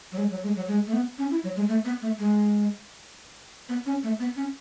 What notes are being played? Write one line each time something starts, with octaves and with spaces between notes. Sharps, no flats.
F#3
G#3
F#3
G#3
F#3
G#3
A3
B3
C#4
E4
F#3
G#3
A3
B3
A3
G#3
B3
C#4
A3
B3
C#4